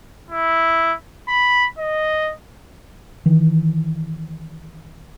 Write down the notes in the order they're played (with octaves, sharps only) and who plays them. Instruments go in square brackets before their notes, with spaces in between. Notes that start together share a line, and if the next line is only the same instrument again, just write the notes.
[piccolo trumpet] E4
B5
D#5
[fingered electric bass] D#3 E3